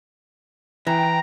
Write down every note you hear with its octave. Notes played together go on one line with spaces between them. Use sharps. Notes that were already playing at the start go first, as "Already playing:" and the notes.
E3 G5 A#5